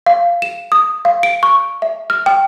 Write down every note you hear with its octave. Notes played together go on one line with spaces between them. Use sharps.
F5
E7
D#6
F5
D7
C#6
E5
F6
G5